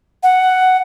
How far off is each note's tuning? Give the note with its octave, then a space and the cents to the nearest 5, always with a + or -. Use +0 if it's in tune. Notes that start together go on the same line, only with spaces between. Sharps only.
F#5 +5